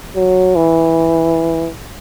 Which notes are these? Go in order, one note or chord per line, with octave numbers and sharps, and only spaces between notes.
F#3
E3